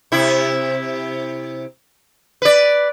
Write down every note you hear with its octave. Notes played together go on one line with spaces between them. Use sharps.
C3 E4
B4 D5